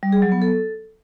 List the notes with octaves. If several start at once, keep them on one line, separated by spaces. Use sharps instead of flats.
G3
G#4
F#3
B3
A4